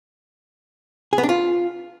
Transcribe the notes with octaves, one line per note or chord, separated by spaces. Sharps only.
G#4
B3
D4
F4